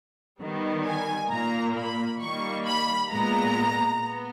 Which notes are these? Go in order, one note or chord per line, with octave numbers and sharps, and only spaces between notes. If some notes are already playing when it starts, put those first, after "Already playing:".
D#3 G3 B3
G#5
A#2 A#3 A#5
B5
D#3 G3 A#3 C#6
B5
A#2 G#3 B3 A#5
B3